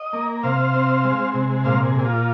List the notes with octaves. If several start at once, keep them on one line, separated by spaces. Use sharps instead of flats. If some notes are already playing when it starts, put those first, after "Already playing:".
Already playing: D#5
A#3
C3 C5 F5
C4
G#3
C3
A#2 C5 F5
G#4
A#2 G#4
F4